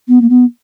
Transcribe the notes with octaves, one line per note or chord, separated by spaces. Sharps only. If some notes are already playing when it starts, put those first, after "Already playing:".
B3
A#3
B3